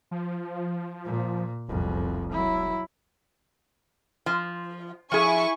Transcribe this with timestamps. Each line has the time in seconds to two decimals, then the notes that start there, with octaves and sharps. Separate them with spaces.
0.11 F3
1.05 A#2
1.68 E1 C2 F2
2.32 F#3 E4
4.26 F3
5.12 F3 E4 G#4 G#5 C#6